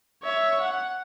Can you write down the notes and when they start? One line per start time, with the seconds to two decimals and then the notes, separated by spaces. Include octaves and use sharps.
0.24 C#5 E5
0.61 F#5